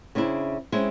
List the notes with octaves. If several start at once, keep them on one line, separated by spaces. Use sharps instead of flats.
C#3 C4 D4 E4
G#3 C4 C#4 E4 E5